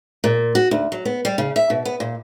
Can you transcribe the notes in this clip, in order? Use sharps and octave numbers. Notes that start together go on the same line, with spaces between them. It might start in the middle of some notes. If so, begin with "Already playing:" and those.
A#2
F#4
D2
F#3
B3
G3
C#3
E5
B2
B3
A#2